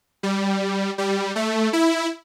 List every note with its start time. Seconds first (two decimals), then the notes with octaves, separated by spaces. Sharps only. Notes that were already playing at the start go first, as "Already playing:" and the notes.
0.23 G3
0.98 G3
1.36 A3
1.73 E4